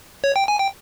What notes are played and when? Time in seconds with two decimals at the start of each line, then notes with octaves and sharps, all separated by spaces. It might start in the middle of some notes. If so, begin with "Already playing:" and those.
0.24 C#5
0.36 G5
0.48 G#5
0.59 G5